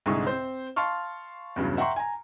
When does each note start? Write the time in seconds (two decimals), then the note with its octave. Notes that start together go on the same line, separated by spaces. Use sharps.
0.06 C2 G#2 D3 G#4 C#6
0.27 C4 C5
0.76 F5 A5 C6 C#6 F6
1.56 E2 G2 C#3 F#3
1.77 E5 F#5 G5 A#5 C6 C#6
1.96 G#5 A#5